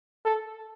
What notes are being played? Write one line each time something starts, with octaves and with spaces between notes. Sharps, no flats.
A4